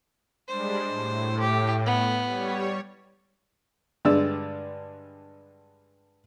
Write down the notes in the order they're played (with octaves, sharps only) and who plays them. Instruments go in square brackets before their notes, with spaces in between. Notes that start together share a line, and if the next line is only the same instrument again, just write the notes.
[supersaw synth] G3 G#3 D4 [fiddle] C5
[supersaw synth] A2
[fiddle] G4
B3
[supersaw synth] G3 C#5
[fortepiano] G2 D3 G#3 D5 E6